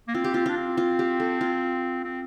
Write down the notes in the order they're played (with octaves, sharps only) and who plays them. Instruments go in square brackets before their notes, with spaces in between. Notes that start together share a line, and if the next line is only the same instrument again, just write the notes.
[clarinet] A#3
[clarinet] C4 [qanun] F4
[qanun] G4
[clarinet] C4 [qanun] F4
[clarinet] D4 [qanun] F4
[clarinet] C4
[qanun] F4
G4
A4
F4
[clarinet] C4